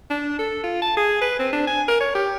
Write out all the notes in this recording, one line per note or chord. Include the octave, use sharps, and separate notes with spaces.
D4
A4
F4
A5
G#4
B4
C4
D4
G#5
A#4
C#5
G4